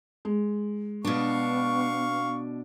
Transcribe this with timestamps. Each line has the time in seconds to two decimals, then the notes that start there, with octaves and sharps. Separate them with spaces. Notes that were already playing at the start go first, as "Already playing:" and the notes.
0.25 G#3
1.05 B2 B3 D4 F5 C#6